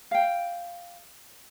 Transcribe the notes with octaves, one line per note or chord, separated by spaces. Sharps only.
F5 G5